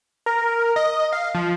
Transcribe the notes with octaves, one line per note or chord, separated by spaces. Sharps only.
A#4
D#5
F5
F3